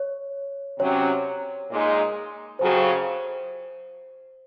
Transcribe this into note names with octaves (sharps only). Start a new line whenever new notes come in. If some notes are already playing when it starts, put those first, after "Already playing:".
Already playing: C#5
C3 F#3 C#4 C#5
A#2 G#3 D#4
F2 C#3 F#3 C5